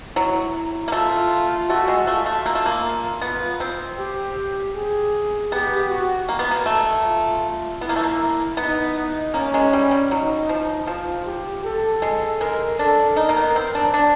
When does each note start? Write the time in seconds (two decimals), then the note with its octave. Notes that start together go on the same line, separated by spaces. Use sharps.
0.16 F#3 E4
0.88 A#3
0.92 A3 F4
1.69 A3 F#4
1.88 G#3
2.07 A3 F4
2.26 A3
2.46 A#3
2.55 A3
2.66 A#3
3.21 B3
3.60 C4
3.98 G4
4.75 G#4
5.52 B3 G4
5.89 F#4
6.29 A#3
6.39 B3
6.51 A#3
6.66 A3
7.05 F4
7.81 B3 E4
7.89 A#3
7.96 A3
8.03 A#3
8.57 B3 D#4
9.34 A#3 C#4
9.54 G#3
9.73 G3
9.91 G3
10.11 F#3 D#4
10.49 F3
10.87 F3 F4
11.26 G4
11.64 A4
12.02 G#3
12.41 G#3 A#4
12.79 D4 A4
13.16 D#4 A#4
13.29 A#3
13.37 B3
13.56 C4
13.75 D4
13.94 D4